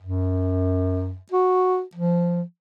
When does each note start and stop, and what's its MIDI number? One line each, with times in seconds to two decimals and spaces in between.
0.02 1.17 42
1.31 1.82 66
1.95 2.42 53